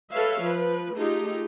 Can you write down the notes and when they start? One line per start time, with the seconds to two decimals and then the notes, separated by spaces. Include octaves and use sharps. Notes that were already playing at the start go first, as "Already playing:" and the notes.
0.11 A4 B4 C#5 E5 F5
0.42 F3 B4
0.96 A3 D#4 F4 G4 G#4